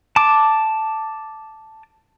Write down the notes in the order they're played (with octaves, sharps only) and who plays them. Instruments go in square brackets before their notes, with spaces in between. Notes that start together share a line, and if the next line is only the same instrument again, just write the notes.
[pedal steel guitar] A5 D6